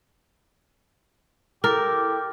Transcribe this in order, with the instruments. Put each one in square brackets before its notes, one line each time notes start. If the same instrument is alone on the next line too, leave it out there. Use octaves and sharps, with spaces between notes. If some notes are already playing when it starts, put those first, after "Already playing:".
[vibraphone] E4 A4 [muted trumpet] G4 [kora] A#4